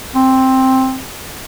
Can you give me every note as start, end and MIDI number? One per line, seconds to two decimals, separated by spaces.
0.15 1.00 60